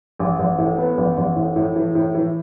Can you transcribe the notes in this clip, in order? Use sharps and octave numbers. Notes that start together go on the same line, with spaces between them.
A1
A1
A2
B3
A1
A1
A2
A2
E3
A2
E3